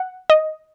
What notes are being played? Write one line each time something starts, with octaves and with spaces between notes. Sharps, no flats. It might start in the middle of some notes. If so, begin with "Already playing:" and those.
Already playing: F#5
D#5